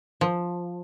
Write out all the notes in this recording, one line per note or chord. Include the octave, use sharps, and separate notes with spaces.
F3